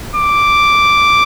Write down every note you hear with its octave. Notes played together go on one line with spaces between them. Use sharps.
D6